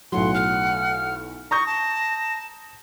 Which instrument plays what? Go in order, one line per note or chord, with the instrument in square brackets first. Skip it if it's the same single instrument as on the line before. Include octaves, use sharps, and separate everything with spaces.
[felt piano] B1 A2 F#3 [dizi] F#5 [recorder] C6
[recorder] F6
[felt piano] A#5 D#6 G6 [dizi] C#6 [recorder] A#6
[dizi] A5